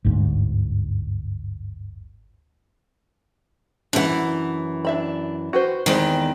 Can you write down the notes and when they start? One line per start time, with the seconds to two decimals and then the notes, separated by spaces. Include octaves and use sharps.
0.04 G1 D2 G#2
3.93 F#2 E3 D4 E4 F#5
4.85 D4 E5 B5
5.53 F#4 B4 C5
5.86 E2 D#3 G3 G#3 C4